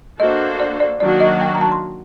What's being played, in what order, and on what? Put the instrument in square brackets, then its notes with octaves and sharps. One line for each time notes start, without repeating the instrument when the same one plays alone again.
[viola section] A#3 D4 F#4 A4 C5 [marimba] D#5
[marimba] D5
D5
[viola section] D#3 F#3 A#3 D4 F#4 [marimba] D5
[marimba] D#5
G5
A#5
A5
C6